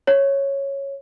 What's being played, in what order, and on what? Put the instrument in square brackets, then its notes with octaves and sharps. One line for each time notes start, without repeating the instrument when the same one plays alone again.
[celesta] C#5